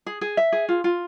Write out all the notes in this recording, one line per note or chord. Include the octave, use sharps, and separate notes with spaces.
G#4
G#4
E5
G#4
F4
F4